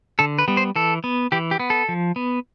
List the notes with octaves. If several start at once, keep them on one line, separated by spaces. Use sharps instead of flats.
D3 A4
B4
G3 B3
C5
E3 A4
B3
E3 G4
G4
B3
A4
F3
B3